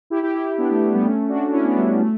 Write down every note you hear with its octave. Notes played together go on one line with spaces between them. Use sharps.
E4 G4
E4 G4
E4 G4
B3 D4
A3
A3
G3 B3
A3 C#4
D4 F#4
C#4 E4
B3 D4
G3 B3
A3